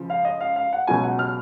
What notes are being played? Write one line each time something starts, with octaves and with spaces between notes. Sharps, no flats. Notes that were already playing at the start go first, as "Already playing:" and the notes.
Already playing: C#2 C#3 F3
F5
D#5
F5
F5
F#5
C#2 B2 F#3 G#5
F#5
F6